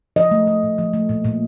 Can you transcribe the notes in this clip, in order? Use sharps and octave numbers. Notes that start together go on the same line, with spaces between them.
F3 D#5
A3
A3
A#2
F3
A3
A#2
A#2